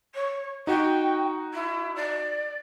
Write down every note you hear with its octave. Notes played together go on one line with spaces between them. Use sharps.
C#5
D#4 F#4 G5
E4
D5